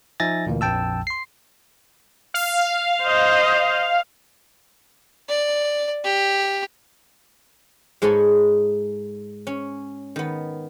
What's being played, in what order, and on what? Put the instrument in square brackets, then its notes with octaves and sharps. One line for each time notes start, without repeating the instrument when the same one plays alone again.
[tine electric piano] F3 D#4 E5 G#5 A6 A#6
D2 A#2 E3 A#3
A#1 F2 G5 A5 E6
C6 C7
[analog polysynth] F5
[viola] C5 D#5
[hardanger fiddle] D5
G4
[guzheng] G#2 G#3 A4 C#5 G#5 B5
C#4
D#3 B3